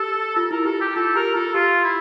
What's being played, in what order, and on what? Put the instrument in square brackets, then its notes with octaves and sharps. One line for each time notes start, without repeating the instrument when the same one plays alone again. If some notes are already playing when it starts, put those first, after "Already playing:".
Already playing: [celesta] G4 [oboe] A4
[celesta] F4 [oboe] A4
[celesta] E4 [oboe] A#4
[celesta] G4 [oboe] A4
[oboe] G4
[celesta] F4 [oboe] A4
[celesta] G4 [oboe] A#4
[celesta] F4 [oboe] A4
[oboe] F4 [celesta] G4
[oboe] E4